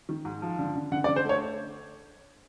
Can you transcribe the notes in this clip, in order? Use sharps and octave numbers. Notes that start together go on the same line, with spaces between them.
D#3
G#2
F3
D3
D3
D3 F#5
D5
D3
C5
A3 C#5